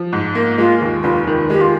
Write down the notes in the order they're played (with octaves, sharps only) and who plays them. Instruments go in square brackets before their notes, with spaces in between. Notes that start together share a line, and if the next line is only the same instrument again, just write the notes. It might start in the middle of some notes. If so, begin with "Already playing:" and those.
Already playing: [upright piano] F3
G#2
A#3
[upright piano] G#3 [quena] F4
[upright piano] D#2
[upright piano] F1 [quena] F4
[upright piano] D#3
[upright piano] G#3 [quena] G4
[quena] F4